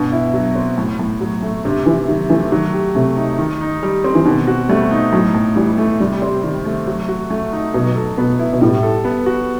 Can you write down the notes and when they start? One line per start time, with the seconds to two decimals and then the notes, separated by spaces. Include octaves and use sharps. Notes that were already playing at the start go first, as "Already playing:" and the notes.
Already playing: G2 B2
0.12 E4
0.34 F#3
0.55 C4
0.78 A2
0.99 A2
1.21 F#3
1.42 A3
1.64 G2 C3
1.86 E3 E4
2.07 D#3 F#3
2.30 E3 A3
2.51 D#3 F#3
2.74 G4
2.95 C3 A3
3.17 D#4
3.38 D#3
3.61 D#4
3.83 G3
4.04 C4
4.15 E3
4.25 B2 D#3
4.47 F#4
4.69 G3 A3
4.91 D#4
5.13 A2 F#3
5.35 A2
5.56 E3 G3
5.78 A3
6.00 C3 G3
6.22 C4
6.44 D#3
6.65 A3
6.87 F#3
7.08 F#4
7.31 A3
7.52 D#4
7.74 B2 F#3
7.96 A4
8.17 B2 B3
8.39 E4
8.53 B2
8.61 A2 G3
8.83 A4
9.05 B3
9.26 F#4